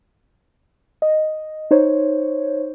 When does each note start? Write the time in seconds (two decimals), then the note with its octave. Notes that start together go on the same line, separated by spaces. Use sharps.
1.02 D#5
1.71 D#4 C5 C#5